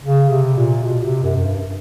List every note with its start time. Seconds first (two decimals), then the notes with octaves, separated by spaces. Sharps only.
0.04 C#3
0.30 C3
0.57 A#2
0.84 B2
1.03 C3
1.23 F#2
1.36 F#2
1.44 G2